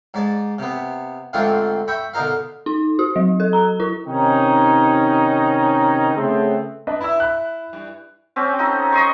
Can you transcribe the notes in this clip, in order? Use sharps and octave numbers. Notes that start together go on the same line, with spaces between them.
G#2 D5 A5
C3 B3
G#2 D3 A3 C4 D4 F4
E5 G5 B5 C#6
B2 D3 D#4 A#4 F5
D#4
F#4
F#3
A4
A#5
E4
C3 D#3 C#4 D#4
C#3 A3 B3 C4
D4 B4 D#5
E4 B5 E6
B5 F#6
G2
C4 C#4 G4
D#4 F#4 A4
D#5 C6 C#6